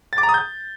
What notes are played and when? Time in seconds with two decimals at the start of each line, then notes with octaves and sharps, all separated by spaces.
0.13 A6
0.18 D6
0.23 A#5
0.29 D#6
0.34 G6